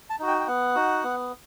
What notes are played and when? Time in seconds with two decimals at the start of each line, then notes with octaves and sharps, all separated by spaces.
0.10 A5
0.19 D#4 F#4
0.28 G5
0.40 G5
0.47 B3 F#5
0.75 D#4 F#4
1.04 B3